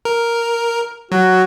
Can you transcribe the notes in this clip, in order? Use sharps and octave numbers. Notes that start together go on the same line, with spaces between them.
A#4
F#3 F#4